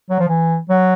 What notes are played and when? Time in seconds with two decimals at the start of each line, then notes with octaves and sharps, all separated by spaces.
0.10 F#3
0.19 F3
0.28 E3
0.69 F#3